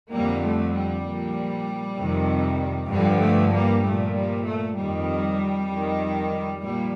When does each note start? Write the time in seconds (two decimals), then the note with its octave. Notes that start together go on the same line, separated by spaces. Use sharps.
0.13 F2 D3 F3 G3 A#3
0.44 A3
0.75 G3
1.06 A#2 F3
1.98 F2 C3 D#3
2.91 G2 D3 F3 G3
3.22 A3
3.53 G3 A#3
3.84 A#2 F3 A3
4.15 G3
4.46 A3
4.77 F2 D#3 G3
5.69 F2 D#3
6.62 A#2 F3 G3